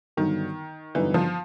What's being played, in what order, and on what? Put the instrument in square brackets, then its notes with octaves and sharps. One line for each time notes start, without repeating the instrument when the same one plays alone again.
[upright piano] G2 D3 F#3 B3 D#4 [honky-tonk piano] D#3
[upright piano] G2 D3 F#3 B3 D#4 [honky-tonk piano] E3
[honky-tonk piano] F3